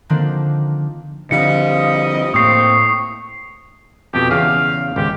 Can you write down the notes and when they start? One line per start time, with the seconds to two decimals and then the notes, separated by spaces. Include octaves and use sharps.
0.09 D3 D#3 F3 A#3 C4 D4
1.31 D3 F3 G3 C4 D#5 F5 C#7
2.34 A2 A#3 C4 C#6 D#6 C7
4.14 F2 B2 G4
4.31 E2 C#3 G#4 F5
4.96 G#1 C#2 G4